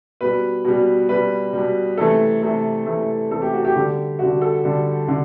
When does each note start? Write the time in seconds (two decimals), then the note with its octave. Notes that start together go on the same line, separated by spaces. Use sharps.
0.21 B2 G3 B4
0.65 B2 G3
1.08 B2 G3 B4
1.53 B2 G3
1.97 C3 E3 A3 A4
2.42 C3 E3 A3
2.86 C3 E3 A3
3.31 C3 E3 A3 A4
3.42 G4
3.54 F#4
3.65 G4
3.76 D3 G3
4.19 D3 G3 F#4
4.42 A4
4.64 D3 G3
5.08 D3